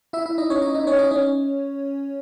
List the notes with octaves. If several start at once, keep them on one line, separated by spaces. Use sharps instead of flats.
E4 E5
E4 E5
D#4 D#5
C#4 C#5
D#4 D#5
D#4 D#5
C#4 C#5
D#4 D#5
C#4 C#5